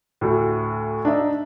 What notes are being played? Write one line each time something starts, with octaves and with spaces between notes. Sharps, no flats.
D2 A2
D4 D#4 E5